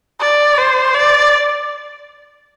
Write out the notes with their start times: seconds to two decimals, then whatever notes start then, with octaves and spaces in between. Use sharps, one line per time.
0.20 D5
0.57 C5
0.94 D5